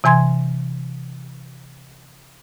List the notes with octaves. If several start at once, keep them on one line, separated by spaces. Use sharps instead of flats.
C3 E3 G#5 C6 G#6